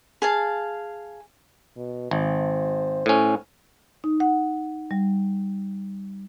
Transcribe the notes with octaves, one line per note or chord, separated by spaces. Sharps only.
G#4 F5 A5
B2
G#1 C5
A2 C#4
D#4
F#5
G3